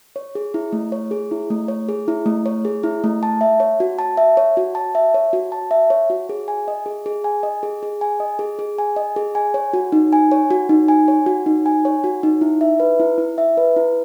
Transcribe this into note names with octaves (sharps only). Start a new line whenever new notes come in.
C#5
G#4
E4
A3
C#5
G#4
E4
A3
C#5
G#4
E4
A3
C#5
G#4
E4
A3
A5
E5
C#5
F#4
A5
E5
C#5
F#4
A5
E5
C#5
F#4
A5
E5
C#5
F#4
G#4
G#5
D#5
G#4
G#4
G#5
D#5
G#4
G#4
G#5
D#5
G#4
G#4
G#5
D#5
G#4
G#5
C#5
F#4
D#4
G#5
C#5
F#4
D#4
G#5
C#5
F#4
D#4
G#5
C#5
F#4
D#4
E4
E5
B4
E4
E4
E5
B4
E4